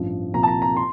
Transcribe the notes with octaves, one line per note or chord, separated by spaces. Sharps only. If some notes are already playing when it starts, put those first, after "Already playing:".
Already playing: A1 G2 F3
C2 A#2 F3 A#5
A5
A#5
A#5
C6